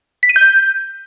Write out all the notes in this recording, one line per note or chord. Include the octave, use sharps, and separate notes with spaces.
B6
D#7
G6